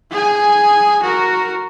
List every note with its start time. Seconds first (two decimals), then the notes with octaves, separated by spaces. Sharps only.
0.11 G#4 G#5
1.03 F#4 A#4